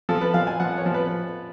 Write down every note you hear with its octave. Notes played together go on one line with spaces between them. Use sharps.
F3 A4
B4
F3 F5
G#5
F3 F#5
C#5
F3
B4